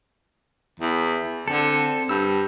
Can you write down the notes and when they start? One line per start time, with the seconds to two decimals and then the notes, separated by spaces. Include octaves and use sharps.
0.80 E2
1.48 D3 C4 A4
2.09 G2 E6